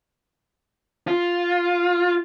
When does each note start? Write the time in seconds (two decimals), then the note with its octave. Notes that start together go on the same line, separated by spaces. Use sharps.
1.08 F4